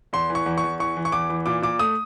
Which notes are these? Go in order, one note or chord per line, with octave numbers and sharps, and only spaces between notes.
E2 C6
E3
C#6
E2
C#6
E2
E3 C#6
E3
C#6
E2 D6
E3
A#2 D6
A#2 D6
A3 D#6